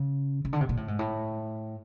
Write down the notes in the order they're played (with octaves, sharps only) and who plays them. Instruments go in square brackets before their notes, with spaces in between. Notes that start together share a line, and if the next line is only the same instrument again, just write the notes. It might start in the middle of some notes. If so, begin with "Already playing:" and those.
Already playing: [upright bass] C#3
C#3
D3
C3
A#2
A2
G#2
A2